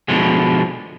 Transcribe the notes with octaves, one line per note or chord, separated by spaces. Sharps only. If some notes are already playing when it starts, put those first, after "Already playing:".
B2 D3 F3 G#3